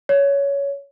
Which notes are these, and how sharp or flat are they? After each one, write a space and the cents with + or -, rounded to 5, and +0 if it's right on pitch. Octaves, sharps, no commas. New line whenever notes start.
C#5 +15